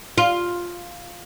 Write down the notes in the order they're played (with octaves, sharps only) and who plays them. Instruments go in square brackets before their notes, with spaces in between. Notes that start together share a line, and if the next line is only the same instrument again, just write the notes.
[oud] F4